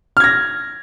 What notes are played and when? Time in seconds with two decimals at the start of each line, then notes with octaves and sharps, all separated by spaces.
0.17 F6
0.20 G#6
0.24 A#6